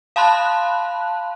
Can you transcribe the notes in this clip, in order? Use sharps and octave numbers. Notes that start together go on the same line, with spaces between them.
F5 A5 B5 C6 F#6